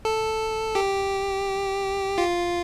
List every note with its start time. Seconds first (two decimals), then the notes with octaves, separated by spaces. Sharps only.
0.05 A4
0.75 G4
2.18 F4